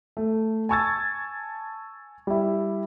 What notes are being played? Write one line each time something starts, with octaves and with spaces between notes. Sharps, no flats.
A3
G#5 A5 C#6 E6 G#6 A6
G3 E4